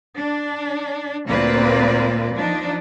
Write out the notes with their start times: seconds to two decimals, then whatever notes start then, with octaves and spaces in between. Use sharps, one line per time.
0.18 D4
1.28 D2 A#2 A#3 C4 B4 D5
2.35 F3 D4 D#4